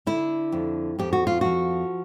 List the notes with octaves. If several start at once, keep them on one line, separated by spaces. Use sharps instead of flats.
D3 E4
F2
F2 G4
F#4
F4
F3 F#4